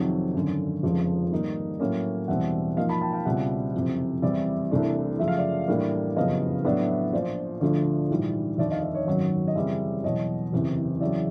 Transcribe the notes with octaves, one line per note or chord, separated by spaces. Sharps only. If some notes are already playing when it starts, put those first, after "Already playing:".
Already playing: F2 C3 D#3 F#3
G#1 F#2 D3
F1 F2 C#3 F3 G#3
G#2 D#3 G3 A#3 D#4
A2 F#3 A#3 C#4
E1 E2 B2 G3 C4 E5 F#5
G#2 F3 A#3 D#5 F5
A5 B5
G5 A5
F5 G5
C#2 B2 G3 C4 E5 F#5
F#1 F2 C3
E2 C3 E3 G3 D5 E5
C2 C3 E3 A3 D4
F#2 C#3 F3 A3 E5
F5
D5 E5
A2 E3 G3 A#3 D4
F#1 F2 C#3 F#3 B3 D#5 F5
A2 F#3 B3 D4 D5 E5
A#1 A#2 F3 C5 D5
D2 D3 F3 A3 D4
A#1 G#2 E3 G3
F1 D#2 D3 D5 E5
D#5 F5
D5 E5
C#5 D#5
G#1 F#2 D#3 F#3
D#5
F#2 C#3 E3 G3 C4 D5 E5
E2 B2 F#3 C#5 D#5
F#1 E2 C3
E2 C#3 F#3 D5 E5